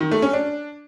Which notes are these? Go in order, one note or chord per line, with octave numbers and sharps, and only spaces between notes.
D#3
A3
C#4
D4